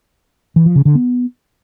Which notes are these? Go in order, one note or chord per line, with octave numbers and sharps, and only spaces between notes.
E3
F3
C#3
D3
B3